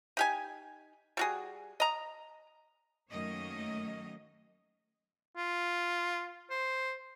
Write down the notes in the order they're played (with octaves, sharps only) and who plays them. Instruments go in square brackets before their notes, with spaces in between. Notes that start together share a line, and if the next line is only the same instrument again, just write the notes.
[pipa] D#4 G4 G#5
G3 F#4 G#4
D#5 A#5
[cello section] F#2 D#3 A3 A#3 C#5 D#5
[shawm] F4
C5